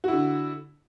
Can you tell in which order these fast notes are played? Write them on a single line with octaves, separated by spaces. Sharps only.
F#4 E4 D3